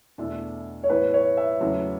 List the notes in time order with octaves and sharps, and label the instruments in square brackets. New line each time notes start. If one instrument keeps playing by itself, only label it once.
[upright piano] E2 B2 A3 D4 A4
[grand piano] C#5
[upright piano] A2 E3 B3 [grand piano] B4
[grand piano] C#5
E5
[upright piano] E2 C#3 F#3 A3